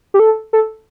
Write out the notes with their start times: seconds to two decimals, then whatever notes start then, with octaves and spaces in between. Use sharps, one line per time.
0.14 G4
0.19 A4
0.53 A4